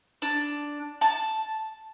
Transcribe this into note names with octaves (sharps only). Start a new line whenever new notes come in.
D4
A5